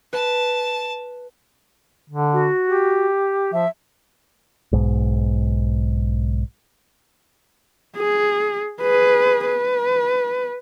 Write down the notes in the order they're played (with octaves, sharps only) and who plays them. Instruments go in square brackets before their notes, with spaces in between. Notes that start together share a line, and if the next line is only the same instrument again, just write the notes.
[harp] B4 [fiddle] A5
[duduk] D3
[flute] F#4
[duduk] G4
[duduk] F3 [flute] E5
[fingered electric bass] B1 G#2
[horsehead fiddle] G#4
G#4 B4
B4